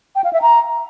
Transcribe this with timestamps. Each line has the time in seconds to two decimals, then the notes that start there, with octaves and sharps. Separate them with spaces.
0.15 G5
0.24 F5
0.33 E5
0.42 A#5